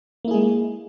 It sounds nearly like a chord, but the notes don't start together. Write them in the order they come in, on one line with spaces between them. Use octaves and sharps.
A#3 E4 G#4 G#3